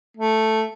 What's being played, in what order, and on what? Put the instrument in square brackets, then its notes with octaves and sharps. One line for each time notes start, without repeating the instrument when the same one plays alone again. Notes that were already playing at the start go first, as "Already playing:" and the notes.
[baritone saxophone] A3